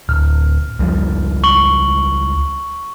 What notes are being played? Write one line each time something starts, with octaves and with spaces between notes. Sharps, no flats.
D1 F6
C#2 F3 G3
C#6 F#7 G7